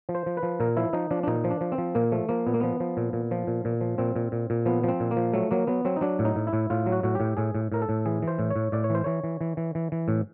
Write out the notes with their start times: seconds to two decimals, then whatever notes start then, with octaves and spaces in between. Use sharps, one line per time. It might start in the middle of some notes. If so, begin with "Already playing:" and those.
0.09 F3
0.15 C5
0.26 F3
0.37 B4
0.43 F3
0.60 A#2 A#4
0.77 F3 E4
0.93 F3 D#4
1.11 F3 D4
1.23 D4
1.27 A#2 D#4
1.44 F3
1.50 D4
1.61 F3
1.72 C4
1.78 F3
1.95 A#2 A#3
2.12 F3 A3
2.29 F3 A#3
2.47 A#2 B3
2.54 A#3
2.60 F3 B3
2.80 F3
2.97 A#2
3.13 A#2
3.31 F3
3.47 A#2
3.65 A#2
3.81 F3
3.98 A#2 C4
4.16 A#2
4.32 A#2
4.50 A#2
4.66 F3 B3
4.84 F3 C4
5.00 A#2
5.11 A#3
5.16 F3
5.33 F#3 A3
5.51 F#3 A#3
5.67 F#3 B3
5.85 F#3 C4
5.96 D#4
6.01 F#3 D4
6.19 A2
6.25 D#4
6.36 A2
6.47 E4
6.53 A2
6.70 A2 F4
6.86 F#3
6.92 F#4
7.03 A2 F#4
7.15 A2 G4
7.37 A2 G#4
7.55 A2
7.72 A2 A#4
7.82 A4
7.89 A2
8.06 E3 G#4
8.22 E3
8.28 C5
8.39 A2
8.50 C#5
8.56 A2
8.72 A2 D5
8.84 C#5
8.90 E3 C5
9.04 E3 C#5
9.24 E3
9.41 E3
9.57 E3
9.75 E3
9.92 E3
10.08 A2